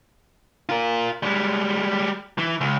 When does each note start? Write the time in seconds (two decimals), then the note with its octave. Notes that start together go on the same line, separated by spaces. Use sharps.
0.69 F4 A#4
1.23 G3 G#3
2.38 E3
2.61 C#2